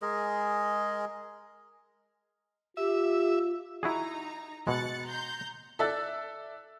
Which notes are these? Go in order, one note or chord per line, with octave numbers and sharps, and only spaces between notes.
G#3 G#4 A#4 D#5
F4 G4 E5
D#4 E4 F#4 G#4 A#5
B2 G#3 F#6 A6 C#7
A#5 C6 G6
A4 D5 E5 E6 F#6 A6